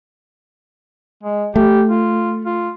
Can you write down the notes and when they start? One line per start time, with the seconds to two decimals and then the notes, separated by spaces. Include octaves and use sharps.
1.24 G#3
1.56 A3 G4
1.89 F4
2.45 F4